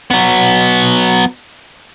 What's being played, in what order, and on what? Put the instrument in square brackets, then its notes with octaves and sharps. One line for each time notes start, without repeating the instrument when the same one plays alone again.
[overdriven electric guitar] F#3 B3